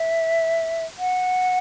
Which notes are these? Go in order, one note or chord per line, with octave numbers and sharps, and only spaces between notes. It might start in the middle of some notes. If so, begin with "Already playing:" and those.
Already playing: E5
F#5